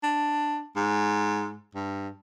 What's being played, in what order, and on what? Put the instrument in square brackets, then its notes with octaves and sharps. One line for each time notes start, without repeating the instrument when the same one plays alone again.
[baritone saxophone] D4
G#2
G2